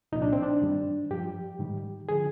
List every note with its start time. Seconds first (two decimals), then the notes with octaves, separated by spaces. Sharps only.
0.12 C2 A#2 F3 D#4
0.22 D4
0.33 C4
0.43 D4
0.62 G2 D#3 G3
1.10 G2 F3 G4
1.59 G#2 D#3 G3
2.09 D3 F3 G#4